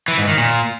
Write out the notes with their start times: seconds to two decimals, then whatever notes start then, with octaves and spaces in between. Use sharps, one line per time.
0.08 E3
0.18 G#2
0.28 D#3
0.38 A#2